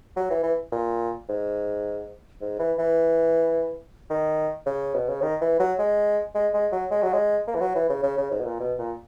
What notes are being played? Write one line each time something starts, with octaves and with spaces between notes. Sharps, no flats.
F#3
E3
E3
A#2
G#2
G#2
E3
E3
D#3
C#3
B2
C#3
D#3
E3
F#3
G#3
G#3
G#3
F#3
G#3
F#3
G#3
A#3
E3
F#3
E3
C#3
C#3
C#3
G#2
B2
A#2
B2
A#2